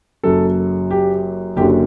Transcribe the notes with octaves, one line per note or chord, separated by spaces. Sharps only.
F#1 F#2 F#3 A4
G4
F#1 F#2 D3 F#3 G4